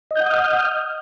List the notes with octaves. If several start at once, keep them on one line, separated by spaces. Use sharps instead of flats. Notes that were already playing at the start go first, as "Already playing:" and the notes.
D#5 F#5 D#6 F6 G6